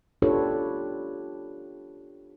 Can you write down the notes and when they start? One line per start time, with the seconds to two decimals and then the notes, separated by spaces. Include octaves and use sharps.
0.22 D4 F4 G4 A4 B4 C#5